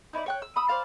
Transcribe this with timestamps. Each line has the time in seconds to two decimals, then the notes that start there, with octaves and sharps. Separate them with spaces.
0.13 D#4 E4 C#5 D5
0.26 C#5 G5 F#6
0.42 E6
0.56 B5 D#6 E6
0.68 C5 D5 F5 A5